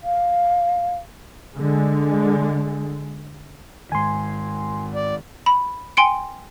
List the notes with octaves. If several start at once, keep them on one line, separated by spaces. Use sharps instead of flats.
F5
D3 G#3
G#2 D#3 G#5 C6
D5
B5
G5 G#5 C6 C#7 D7